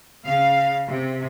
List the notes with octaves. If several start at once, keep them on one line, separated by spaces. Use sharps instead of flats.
C#3 F5
C3